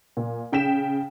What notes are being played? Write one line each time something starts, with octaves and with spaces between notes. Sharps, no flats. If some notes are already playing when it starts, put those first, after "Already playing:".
A#2
C#3 G5 B6 E7